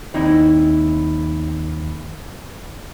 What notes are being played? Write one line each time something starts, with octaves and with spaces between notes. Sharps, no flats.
D#2 C4 D#4 E4 D#5